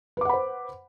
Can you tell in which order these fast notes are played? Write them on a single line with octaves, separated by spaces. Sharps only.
B4 D6 F#5 B5 C5